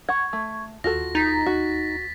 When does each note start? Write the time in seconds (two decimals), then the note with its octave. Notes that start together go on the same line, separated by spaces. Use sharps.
0.09 F#5 C#6 G#6
0.33 A3
0.84 D#2 F4 F#4 A4 A#6
1.15 D#4 A6 B6
1.46 F#4